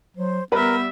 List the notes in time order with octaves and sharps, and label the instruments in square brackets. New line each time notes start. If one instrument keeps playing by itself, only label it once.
[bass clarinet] F#3 [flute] C5
[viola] G3 E5 [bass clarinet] B3 [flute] A#4 [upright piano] B4 A#5 B5